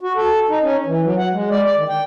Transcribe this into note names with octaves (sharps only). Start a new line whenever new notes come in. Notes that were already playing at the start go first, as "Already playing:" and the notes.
F#4
A4
D#4
C#4
E3
F#3
F#5
G#3
D5
D5
D#3
G5